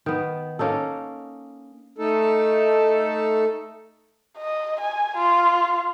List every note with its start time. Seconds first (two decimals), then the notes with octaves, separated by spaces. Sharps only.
0.06 D#3 B3
0.59 A#3 C#4 D#4 A4
1.98 A3 D#4 A4
4.38 D#5
4.80 G#5
5.17 F4